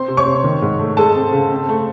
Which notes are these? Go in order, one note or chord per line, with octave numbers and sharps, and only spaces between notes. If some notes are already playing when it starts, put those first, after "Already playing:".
Already playing: C4 C5 C6
C3
C#5 C#6
C3
D#3
G#2
A3
G#3 A4 A5
C4
C#3
C4
A3